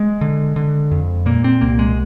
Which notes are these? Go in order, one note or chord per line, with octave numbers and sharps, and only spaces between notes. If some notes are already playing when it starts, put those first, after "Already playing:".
Already playing: G#3
D3
D3
F2
A#2 A#3
C4
C2 A#3
G#3